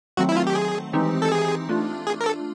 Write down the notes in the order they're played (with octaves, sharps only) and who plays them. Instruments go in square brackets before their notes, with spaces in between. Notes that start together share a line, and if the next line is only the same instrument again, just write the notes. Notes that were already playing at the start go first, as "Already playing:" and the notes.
[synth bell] D#3 F#3 A3 C4 [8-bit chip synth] F#4
[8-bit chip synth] E4
F4
G4
G#4
[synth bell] E3 G#3 C4 D#4 G4
[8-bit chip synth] A4
G#4
[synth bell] A3 D4 F4
[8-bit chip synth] G#4
A#4
A4